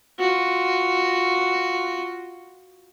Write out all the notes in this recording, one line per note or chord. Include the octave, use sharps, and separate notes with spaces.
F4 F#4